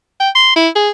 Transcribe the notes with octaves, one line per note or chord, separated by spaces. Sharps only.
G5
C6
E4
G#4